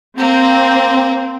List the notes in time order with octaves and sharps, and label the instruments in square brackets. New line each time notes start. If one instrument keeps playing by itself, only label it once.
[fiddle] A#3 [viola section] C4